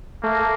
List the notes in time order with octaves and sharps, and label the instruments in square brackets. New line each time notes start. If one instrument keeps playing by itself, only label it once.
[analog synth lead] A3 [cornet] A#3
[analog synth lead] A3